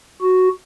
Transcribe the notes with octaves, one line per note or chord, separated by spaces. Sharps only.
F#4